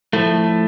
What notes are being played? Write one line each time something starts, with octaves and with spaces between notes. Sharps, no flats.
A2 F3 A3